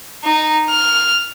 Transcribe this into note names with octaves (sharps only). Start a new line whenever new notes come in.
D#4
F6